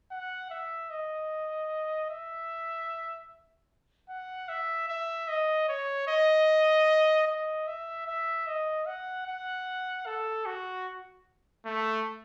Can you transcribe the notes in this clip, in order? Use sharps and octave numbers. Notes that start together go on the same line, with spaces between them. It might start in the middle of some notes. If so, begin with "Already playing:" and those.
F#5
E5
D#5
E5
F#5
E5
E5
D#5
C#5
D#5
D#5
E5
E5
D#5
F#5
F#5
A4
F#4
A3